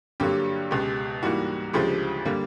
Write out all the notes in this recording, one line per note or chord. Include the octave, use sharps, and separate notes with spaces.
G2 D3 F#3 A#3 G4
C#2 B2 G#3 G4
G#2 E3 G3 A#3 F#4
D2 C#3 F3 G#3 G4
D3 G3 A#3